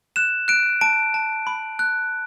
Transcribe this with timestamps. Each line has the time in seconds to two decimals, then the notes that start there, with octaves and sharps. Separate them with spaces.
0.16 F#6 E7
0.48 F#6 D7
0.81 A5 D7
1.14 A5
1.47 B5
1.79 F#6